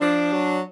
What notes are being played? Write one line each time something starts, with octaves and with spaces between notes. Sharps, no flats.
F3 D4
F#3